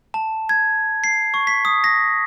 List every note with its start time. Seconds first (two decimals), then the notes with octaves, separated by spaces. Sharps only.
0.14 A5
0.49 G#6
1.04 C7
1.34 C#6
1.47 B6
1.65 D#6
1.84 A#6